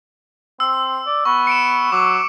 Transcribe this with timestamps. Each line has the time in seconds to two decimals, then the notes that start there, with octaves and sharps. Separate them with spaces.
0.60 C4 E6
1.06 D5
1.25 B3 C#6
1.47 C#7 D7 E7
1.92 F#3 D6